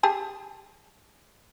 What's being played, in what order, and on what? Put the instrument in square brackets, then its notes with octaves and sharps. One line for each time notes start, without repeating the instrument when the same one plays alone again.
[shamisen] G4 G#4 A5